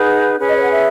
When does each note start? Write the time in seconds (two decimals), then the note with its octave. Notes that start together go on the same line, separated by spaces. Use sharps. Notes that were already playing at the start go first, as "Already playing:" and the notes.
Already playing: D#4 G#4 B4 F#5
0.38 C#4 G#4 B4
0.47 D#5
0.55 C#5
0.63 F#5
0.71 E5